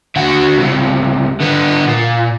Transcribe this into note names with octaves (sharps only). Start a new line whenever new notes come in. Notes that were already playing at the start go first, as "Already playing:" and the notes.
D3 F#4
C#2 C3
D3 B3
A#2